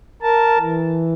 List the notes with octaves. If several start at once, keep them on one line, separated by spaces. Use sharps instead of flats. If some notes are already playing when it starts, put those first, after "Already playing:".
A#4 A5
E3